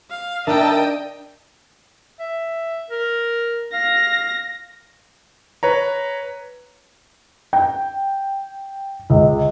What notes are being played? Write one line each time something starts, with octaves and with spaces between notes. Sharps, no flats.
F5
D4 A#4 D#5 E5 G5 A5
E5
A#4
F5 A#6
B4 C#5 A#5
G5
C#2